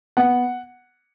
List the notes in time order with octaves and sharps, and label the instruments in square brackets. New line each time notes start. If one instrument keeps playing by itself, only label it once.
[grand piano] B3 F#5